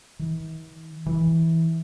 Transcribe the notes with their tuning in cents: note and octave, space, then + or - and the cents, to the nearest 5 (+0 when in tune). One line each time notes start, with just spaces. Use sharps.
E3 -45
E3 -15